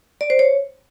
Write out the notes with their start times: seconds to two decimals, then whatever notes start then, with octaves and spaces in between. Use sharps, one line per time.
0.21 D5
0.30 C5
0.39 C#5